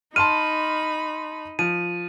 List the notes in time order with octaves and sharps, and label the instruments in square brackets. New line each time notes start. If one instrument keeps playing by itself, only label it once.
[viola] D#4 B5 [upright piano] A5 C6 F6 [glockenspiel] D#7
[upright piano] F3 [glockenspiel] D#7